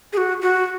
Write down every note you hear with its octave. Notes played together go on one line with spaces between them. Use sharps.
G#4
F#4
F#4